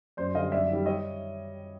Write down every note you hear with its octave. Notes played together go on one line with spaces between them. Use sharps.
F#2 C5 D5
D3 G3 D#5 F5
F#2 D5 E5
D#3 G3
C#5 D#5